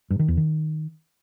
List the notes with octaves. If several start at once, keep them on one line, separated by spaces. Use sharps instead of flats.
G2
D#3
E2
D#3